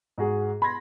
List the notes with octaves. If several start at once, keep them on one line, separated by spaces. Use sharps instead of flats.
G#2 F#4 G#4
B5 C6 G#6 A#6